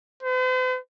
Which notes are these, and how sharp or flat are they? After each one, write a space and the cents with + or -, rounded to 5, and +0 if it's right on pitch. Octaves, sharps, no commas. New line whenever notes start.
C5 -45